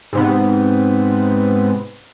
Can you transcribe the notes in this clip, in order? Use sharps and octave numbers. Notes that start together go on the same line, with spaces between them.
G#2 C3 B3